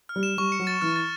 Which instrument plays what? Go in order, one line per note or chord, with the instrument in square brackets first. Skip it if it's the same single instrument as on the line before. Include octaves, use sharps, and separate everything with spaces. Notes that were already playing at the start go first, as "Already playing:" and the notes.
[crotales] F6
[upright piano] G3
[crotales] E7
[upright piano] G3 [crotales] C#6
[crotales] C#7
[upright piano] F#3
[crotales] A6
[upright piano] E3 [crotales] F6
[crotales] A6